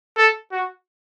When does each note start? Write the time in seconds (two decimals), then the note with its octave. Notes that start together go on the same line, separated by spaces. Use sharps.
0.17 A4
0.52 F#4